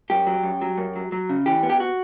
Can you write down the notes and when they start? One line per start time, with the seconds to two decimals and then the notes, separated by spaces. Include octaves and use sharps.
0.10 F#2 G4
0.27 F#3
0.43 F#2
0.62 F#3
0.78 F#2
0.96 F#3
1.12 F#3
1.30 C#3
1.46 E3 G4
1.63 B3
1.70 G4
1.80 F#4